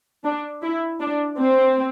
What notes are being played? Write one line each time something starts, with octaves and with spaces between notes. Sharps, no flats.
D4
E4
D4
C4